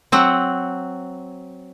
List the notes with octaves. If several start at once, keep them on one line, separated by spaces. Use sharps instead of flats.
F#3 C4 F#5